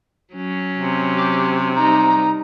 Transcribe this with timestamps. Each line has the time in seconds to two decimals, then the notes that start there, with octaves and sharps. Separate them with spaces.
0.33 F#3 C#4
0.76 C3
1.16 G4
1.75 G3 D#4 A#5